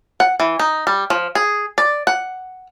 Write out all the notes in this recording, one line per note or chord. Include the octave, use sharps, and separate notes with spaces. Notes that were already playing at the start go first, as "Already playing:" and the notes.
F#5
E3
D#4
G3
F3
G#4
D5
F#5